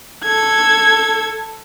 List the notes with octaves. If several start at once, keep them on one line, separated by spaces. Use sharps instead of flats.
A4 G#6